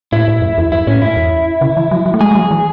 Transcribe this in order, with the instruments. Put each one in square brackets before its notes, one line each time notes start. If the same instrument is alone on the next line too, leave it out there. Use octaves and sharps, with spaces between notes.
[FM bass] A2 [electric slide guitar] E4
[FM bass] A2
F#2
E2
[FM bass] F#2 [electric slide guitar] E4
[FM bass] A2 [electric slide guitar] C#4
[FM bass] G#2 [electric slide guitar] E4
[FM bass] E2
C#3
E3
F#3
F#3
A3
[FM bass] G#3 [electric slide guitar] G#4
[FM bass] G#3
F#3
E3